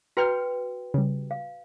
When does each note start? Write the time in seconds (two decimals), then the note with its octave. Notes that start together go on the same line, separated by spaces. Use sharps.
0.17 F#4 B4 G5 A#5 F6 G6
0.94 C#3 G3
1.31 F5